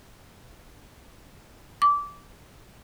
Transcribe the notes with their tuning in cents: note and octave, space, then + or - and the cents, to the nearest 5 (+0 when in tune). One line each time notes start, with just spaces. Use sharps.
D6 -20